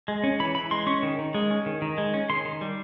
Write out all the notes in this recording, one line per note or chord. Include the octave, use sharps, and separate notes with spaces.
G#3
C#4
E3 B5
E3 B5
G#3 C6
C#4 C#6
D#3
D#3
G#3
C#4
D#3
D#3
G#3
C#4
D#3 C6
D#3
G3